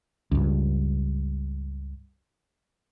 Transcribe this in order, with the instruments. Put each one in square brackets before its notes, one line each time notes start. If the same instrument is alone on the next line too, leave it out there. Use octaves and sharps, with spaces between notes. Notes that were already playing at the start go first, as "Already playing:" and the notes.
[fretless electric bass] C#2 G2